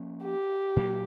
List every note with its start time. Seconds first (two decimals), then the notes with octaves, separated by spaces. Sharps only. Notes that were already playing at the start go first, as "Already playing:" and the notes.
Already playing: F3 A#3 C#4
0.24 G4
0.76 A#2 F#3 A#3